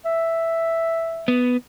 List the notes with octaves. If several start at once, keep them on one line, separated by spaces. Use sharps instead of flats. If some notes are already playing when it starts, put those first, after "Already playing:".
E5
B3